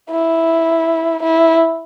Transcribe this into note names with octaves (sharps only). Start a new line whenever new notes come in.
E4
E4